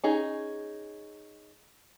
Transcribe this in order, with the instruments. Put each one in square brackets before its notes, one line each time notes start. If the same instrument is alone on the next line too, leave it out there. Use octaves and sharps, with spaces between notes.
[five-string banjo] C#4 D#4 G#4